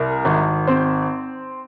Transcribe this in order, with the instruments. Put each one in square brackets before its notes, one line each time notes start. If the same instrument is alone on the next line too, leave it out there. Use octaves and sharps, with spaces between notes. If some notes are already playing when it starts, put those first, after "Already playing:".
Already playing: [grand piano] C2 A#4
G#1
C4 C5